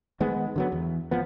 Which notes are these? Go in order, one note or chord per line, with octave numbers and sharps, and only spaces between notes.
D#3 G#3 B3
D3 F#3 B3
E2
G#1 F3 B3